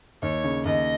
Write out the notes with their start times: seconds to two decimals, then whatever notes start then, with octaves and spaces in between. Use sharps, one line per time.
0.22 D#2 C#5
0.44 C#3
0.65 D#2 D#5